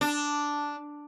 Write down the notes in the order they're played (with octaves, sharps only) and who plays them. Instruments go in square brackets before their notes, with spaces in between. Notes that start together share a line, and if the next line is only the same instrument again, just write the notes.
[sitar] D4